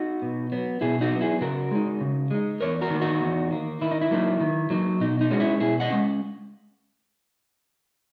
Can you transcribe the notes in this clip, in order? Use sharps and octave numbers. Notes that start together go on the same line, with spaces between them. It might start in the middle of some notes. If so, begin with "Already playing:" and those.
Already playing: D#4 F#4
B2
F#3 B3
B2 E4 G#4
D#4 F#4
F#3 B3
E4 G#4
C#3 F#4 A#4
G#3 D#4
C#3
G#3 D#4
E2 A#4 C#5
F#4 A#4
D#3 A#3
D#4 F#4
E2
D#3 A#3
D#3 E4
D#4
E4
F#3 A#3 D#4
D#3
F#3 A#3 D#4
B2 D#4
D#4
G#3 C#4 F#4
E4
B2 E4 G#4
D#5 F#5
G#3 C#4